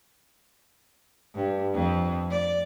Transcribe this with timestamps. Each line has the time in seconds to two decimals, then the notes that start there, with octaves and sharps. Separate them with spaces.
1.34 G2
1.74 F2
2.30 D5